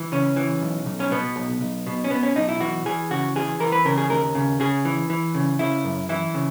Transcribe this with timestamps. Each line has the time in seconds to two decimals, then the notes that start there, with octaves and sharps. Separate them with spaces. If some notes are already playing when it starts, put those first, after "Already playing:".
Already playing: E3
0.12 C#3 C#4
0.36 E3
0.61 B1
0.86 B1
1.00 C#4
1.11 B2 B3
1.36 B1
1.61 B1
1.87 B2
2.04 C#4
2.10 B2 B3
2.23 C#4
2.36 B1 D#4
2.48 E4
2.61 E3 F#4
2.86 E3 G#4
3.11 C#3 F#4
3.36 E3 G#4
3.60 E3 A#4
3.72 B4
3.85 C#3 A#4
3.98 G#4
4.10 D#2 A#4
4.35 C#3
4.60 C#3 G#4
4.85 E3
5.10 E3
5.35 C#3
5.59 C#3 E4
5.85 F#2
6.09 E3 E4
6.34 C#3